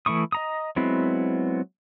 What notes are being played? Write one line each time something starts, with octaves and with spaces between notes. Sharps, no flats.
E3 A3 E4 C#6 D#6
D#5 A#5 D#6
F#3 G#3 B3 C4 E4